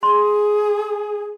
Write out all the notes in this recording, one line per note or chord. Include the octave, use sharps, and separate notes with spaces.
G#4 C6